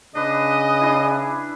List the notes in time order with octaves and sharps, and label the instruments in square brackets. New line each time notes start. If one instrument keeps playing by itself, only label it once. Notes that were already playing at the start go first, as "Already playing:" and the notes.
[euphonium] C#3 [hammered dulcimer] D4 B4 [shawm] D#5
[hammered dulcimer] D4 E4